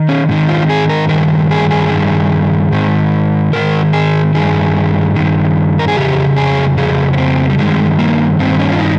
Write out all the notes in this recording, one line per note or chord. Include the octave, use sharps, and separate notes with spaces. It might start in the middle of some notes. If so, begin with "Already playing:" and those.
Already playing: D#3
C#4
G#2 D#3
F4
G#4
A#4
G2 D#3 A#4
G#4
G#4
G2 D#3
G#2 D#3
G#2 D#3 A#4
G#4
G2 D#3 G#4
G2 D#3
A#4
G#4
F2 C#3 G4
G#4
F2 C#3 G#4
C#4
C4
G3
G2 D#3 G#3
A#3
G2 D#3 C4
C#4
F4
D#4